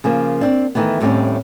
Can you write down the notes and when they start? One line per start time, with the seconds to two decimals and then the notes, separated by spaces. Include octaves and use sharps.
0.04 C#3 F3 A#3
0.41 C4 D4
0.75 D#3 E3 A3 B3
1.00 D#2 A2 G3 C4 C#4